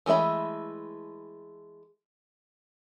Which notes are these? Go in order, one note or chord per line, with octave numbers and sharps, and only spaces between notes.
E3 G#3 A3 E5 B5